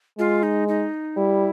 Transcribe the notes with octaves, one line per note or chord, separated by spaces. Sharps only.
G#3 F4
D#4
D#4
G3 E4